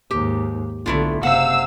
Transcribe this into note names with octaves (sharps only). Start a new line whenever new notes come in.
D#2 G#2 G4
B1 D3 A3 E4 F4
F#1 C3 F5 F#5 E6